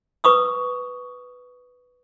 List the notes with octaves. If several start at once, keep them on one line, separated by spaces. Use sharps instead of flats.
B4 C#6 D#6 E6